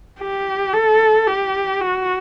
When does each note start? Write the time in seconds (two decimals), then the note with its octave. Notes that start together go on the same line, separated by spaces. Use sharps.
0.20 G4
0.74 A4
1.28 G4
1.81 F#4